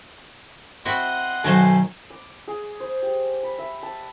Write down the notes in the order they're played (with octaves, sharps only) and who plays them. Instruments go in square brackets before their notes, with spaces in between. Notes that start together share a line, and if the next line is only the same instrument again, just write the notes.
[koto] C4 E4 F#4 [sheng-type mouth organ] D#5 F#5 C6
[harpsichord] B1 C5 A5 [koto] D#3 A3 D#4 [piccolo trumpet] G#5
[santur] D6
G#4
C5
G4
B5
E5
A5